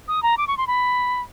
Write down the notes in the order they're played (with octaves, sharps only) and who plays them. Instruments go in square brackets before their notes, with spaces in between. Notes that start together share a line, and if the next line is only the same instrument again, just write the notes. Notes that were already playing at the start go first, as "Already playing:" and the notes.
[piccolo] D#6
A#5
D6
C#6
C6
B5